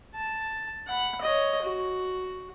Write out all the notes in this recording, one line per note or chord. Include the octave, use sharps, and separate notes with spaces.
A5
F#5 B5
C#5 D#5
F#4